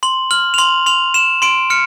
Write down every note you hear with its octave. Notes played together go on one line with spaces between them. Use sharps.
C6 F#7
F6 F#7
F7
C6 F#7
C6 F7
C6 E7
C6 D7
F6 C#7